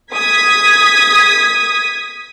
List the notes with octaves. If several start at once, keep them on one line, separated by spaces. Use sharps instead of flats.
D#6 G#6 B6